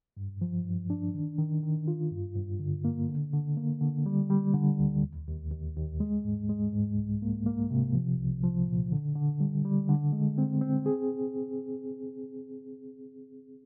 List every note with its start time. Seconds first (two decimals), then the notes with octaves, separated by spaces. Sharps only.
0.17 G2
0.41 F3
0.65 G2
0.90 D4
1.14 D#3
1.39 D#3
1.62 D#3
1.88 F4
2.11 G2
2.35 G2
2.60 D3
2.84 A#3
3.09 D3
3.33 D3
3.57 A#3
3.81 D3
4.06 G3
4.30 G3
4.54 D3
4.79 D2
5.03 D#2
5.27 D#2
5.51 D#2
5.76 D#2
6.00 G#3
6.24 G#2
6.49 G#3
6.72 G#2
6.97 C2
7.22 A#3
7.46 A#3
7.70 C3
7.94 F3
8.18 C2
8.44 F3
8.67 A#2
8.92 D3
9.16 D3
9.40 G3
9.65 G3
9.89 D3
10.12 G#3
10.38 C4
10.61 C4
10.86 G#4